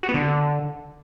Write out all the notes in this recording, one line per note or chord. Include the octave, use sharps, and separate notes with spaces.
F#4
B3
D3